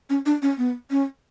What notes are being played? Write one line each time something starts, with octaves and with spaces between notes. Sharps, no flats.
C#4
D4
C#4
B3
C#4